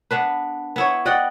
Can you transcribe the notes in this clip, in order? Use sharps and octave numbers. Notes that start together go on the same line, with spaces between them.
B3 D4 B4
B3 E4 C#5
D5 D#5 F#5 G5